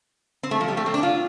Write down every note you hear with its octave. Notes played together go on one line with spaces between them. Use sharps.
C4
A3
F3
G3
A3
C4
D4
F4